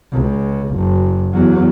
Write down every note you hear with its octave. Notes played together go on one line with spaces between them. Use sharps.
C#2
F#1
E2 F#3